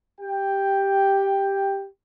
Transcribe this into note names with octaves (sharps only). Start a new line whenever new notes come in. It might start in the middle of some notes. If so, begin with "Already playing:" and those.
G4 G5